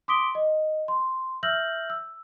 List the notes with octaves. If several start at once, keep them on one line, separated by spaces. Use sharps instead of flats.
C6 D6 D#6 B6 D7 G7
D#5
C6
E5 E6 F6 G6 A#6 F#7
E6